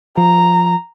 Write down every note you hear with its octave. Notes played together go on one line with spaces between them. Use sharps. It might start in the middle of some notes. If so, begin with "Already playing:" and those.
F3 A#5